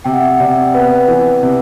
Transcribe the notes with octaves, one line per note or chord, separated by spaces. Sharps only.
C3 G5
F#5
E5
F#5
C3 D5
B3 B4
E3
C3